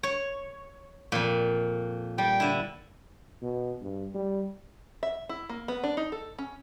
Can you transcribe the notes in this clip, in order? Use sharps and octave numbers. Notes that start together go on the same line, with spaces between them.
C#5
F2 A#2
G3 G5
D3 E4
B2
G2
G3
E5
E4
A#3
B3
D4
D#4
A4
C#4